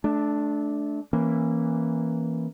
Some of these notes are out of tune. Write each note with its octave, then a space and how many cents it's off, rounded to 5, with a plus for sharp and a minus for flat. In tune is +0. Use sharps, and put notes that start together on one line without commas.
A3 -25 D4 +0
E3 +0 A#3 +0 C#4 -25